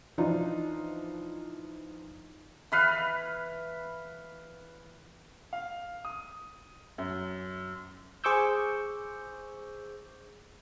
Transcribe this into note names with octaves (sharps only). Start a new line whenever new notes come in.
E3 F3 D4 D#4 F4
E3 B4 F5
F5
D#6
F#2
G#4 C5 C#6 D6 E6 G6